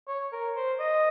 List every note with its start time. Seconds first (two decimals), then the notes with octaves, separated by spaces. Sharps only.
0.08 C#5
0.32 A#4
0.56 C5
0.80 D#5